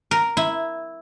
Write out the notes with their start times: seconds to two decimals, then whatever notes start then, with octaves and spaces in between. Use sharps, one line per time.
0.11 A#4
0.37 E4